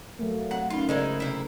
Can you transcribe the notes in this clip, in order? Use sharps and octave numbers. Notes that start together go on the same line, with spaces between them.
F#3 A3 A#3
C4 F#5
C#4 D#4 F4
C#3 G#3 D#4 E4 A#4 C5 D5
C3 E4